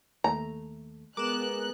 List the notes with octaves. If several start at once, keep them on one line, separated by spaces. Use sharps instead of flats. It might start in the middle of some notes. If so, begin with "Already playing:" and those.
D#2 A3 A#5
G#3 B3 A#4 D6 F#6 E7